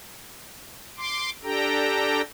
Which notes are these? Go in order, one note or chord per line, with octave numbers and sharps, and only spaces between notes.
C6 D6
D4 G4 A4 G5 A#5